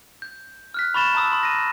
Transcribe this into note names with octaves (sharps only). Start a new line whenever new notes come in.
G6
F6 F#6 B6
B5 C#6 A6 E7
A5 A#5 D#6 E6
C6 D#6
A#6 D#7